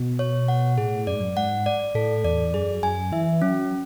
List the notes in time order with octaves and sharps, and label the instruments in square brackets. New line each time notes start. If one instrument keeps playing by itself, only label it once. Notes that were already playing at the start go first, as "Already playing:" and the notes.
Already playing: [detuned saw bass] B2
[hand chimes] C#5
F#5
[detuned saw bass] A2 [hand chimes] G#4
[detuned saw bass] F#2 [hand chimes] D5
[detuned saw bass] G#2
F#2
[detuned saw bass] G#2 [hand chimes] F#5
[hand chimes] D5
[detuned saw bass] A2 [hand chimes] A4
[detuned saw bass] E2 [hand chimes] D5
[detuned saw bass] F#2 [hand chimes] G#4
[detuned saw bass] F#2 [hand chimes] G#5
[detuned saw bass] E3 [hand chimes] E5
[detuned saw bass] F#3 [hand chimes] C#4